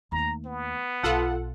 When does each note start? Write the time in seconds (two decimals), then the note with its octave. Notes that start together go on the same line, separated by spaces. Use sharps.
0.12 D#2 A3 A#5
0.46 B3
1.03 B1 F4 A4 F#5